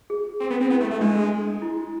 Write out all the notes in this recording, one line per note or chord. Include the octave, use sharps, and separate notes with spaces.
G#4
C4
B3
C4
B3 E4
A3
A3
G#3 D4
E4